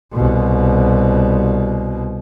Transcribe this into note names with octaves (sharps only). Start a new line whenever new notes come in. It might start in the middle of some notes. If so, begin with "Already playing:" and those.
C2 B2